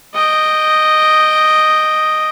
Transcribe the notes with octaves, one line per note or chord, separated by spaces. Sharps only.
D#5 G5